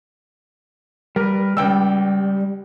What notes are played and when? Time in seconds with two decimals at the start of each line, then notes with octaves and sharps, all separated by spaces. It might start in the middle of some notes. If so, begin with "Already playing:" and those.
1.16 G3 A#4 B4
1.57 C#2 G3 G5 E6